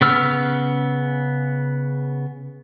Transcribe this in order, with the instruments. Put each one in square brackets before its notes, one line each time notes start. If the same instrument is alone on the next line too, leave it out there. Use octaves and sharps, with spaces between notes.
[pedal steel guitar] C#3 B3 E6 F6